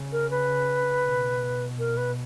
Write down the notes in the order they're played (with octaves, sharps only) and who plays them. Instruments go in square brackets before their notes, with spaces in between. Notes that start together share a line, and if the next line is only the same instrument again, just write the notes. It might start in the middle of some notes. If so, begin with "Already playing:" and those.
Already playing: [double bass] C#3
[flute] A#4
B4
[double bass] B2
[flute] A#4
B4